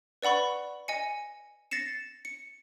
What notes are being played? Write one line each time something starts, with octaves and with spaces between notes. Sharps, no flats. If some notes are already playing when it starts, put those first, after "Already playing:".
B4 D5 F#5 B5 C#6
D#5 G#5 C#7
A6 A#6 C7 C#7 E7
C#7